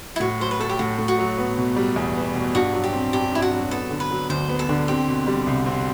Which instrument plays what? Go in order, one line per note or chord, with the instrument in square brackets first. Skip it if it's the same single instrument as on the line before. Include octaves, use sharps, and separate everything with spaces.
[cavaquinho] E4
[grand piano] A2 [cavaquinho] F#4
[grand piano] F#3 [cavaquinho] C5
[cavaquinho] B4
[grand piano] A3 [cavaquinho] A4
[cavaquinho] G4
[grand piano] A2 [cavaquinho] F#4
[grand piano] A2
[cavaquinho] F#4
[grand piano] F#3
B3
B2
G3
E2
B3
B2
[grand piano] G2 [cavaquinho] F#4
[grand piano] F#3
[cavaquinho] G4
[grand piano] C4
[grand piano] G2 [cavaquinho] G4
[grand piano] G2 [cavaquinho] E4
[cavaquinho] F#4
[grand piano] F#3
[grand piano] B3 [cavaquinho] A4
[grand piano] D3
[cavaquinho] B4
[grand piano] F#3
[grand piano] D2 [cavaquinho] C5
[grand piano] B3
[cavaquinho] A4
[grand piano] D3
[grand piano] C4 [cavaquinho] G4
[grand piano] B2
G3
C2
C4